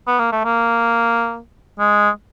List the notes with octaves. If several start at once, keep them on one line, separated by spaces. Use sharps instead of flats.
B3
A#3
A3
A#3
G#3